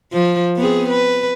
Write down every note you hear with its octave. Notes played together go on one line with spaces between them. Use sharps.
F3
B3 C4 G#4
B4